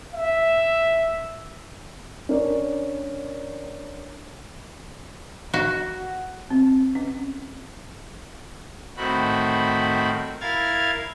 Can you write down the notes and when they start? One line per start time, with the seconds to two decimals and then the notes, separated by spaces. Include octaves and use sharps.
0.14 E5
2.29 C#4 D4 A#4 D5
5.54 F#4
6.50 C4
6.95 C#4
8.96 A2 D#3 C4 F#4 B5
10.41 E4 A#4 F5 F6 G#6 A6